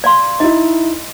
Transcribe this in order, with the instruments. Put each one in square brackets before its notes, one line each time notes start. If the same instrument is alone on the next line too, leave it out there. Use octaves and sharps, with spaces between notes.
[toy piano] D5 F5 C6
[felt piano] D#4 E4 [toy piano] D#5